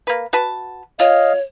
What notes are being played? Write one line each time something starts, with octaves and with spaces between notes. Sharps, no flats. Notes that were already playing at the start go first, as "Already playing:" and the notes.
A#3 B4
F#4 B4 A5
F4 C#5 D#5 F5